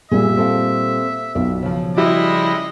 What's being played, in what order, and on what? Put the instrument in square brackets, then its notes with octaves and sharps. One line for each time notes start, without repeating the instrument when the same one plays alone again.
[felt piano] A#2 G3 [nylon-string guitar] G#4 [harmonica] E5
[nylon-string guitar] C4 A4 F5
[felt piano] B1 [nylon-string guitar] F4 D5
[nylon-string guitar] C#3 F3
[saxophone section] G3 G#3 E4 [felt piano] F#4 [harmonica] D#5